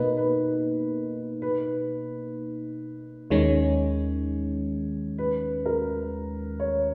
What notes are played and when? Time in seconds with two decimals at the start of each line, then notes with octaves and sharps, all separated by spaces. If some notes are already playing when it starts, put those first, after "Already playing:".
Already playing: B2 A#3 D#4 B4
0.17 B4
1.42 B4
3.30 D#2 D#3 G#3 C#4 C#5
5.18 B4
5.66 A#4
6.60 C#5